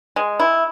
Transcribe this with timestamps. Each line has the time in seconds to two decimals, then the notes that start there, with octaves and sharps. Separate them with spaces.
0.16 G#3
0.40 E4